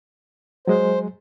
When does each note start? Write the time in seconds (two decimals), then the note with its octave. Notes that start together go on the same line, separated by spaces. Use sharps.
0.67 F#3 G#3 C5